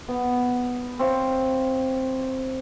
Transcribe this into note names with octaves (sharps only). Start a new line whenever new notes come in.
B3
C4 C#5 F5